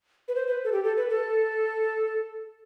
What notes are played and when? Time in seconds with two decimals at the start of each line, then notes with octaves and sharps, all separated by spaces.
0.28 B4
0.35 C5
0.47 B4
0.64 A4
0.72 G4
0.84 A4
0.97 B4
1.09 A4